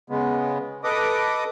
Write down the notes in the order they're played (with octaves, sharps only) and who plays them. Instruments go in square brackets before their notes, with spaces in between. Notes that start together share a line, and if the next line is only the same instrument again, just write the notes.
[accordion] C#3 G#3 B3
A4 B4 D#5 D6 D#6